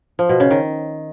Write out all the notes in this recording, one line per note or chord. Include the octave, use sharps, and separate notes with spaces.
F3
B2
C#3
D#3